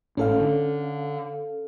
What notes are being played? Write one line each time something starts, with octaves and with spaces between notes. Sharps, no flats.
G#1 A2 C#4 A4 F5
D3